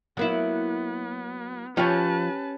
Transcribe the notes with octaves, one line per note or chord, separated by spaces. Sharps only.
F#3 A#3 B3 E4
F3 C#4 G4 B4 C#5 A5